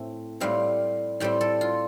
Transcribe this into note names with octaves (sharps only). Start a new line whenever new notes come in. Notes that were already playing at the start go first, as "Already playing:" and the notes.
Already playing: A2 A3 C4
A2 G3 C4 F5
A2 G3 C4 G5
A4
F4